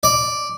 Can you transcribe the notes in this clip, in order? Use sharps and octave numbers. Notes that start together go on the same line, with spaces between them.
D5